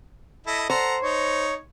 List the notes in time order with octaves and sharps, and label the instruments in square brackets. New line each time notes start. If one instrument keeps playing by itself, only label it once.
[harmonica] E4 A4 D#5
[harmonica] A4 F#5 A#5 [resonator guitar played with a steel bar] C5
[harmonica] D#4 [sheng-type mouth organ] C#5